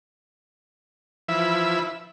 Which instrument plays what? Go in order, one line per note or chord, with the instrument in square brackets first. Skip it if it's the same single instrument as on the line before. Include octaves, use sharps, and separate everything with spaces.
[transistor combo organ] E3 F3 E4 E5 B5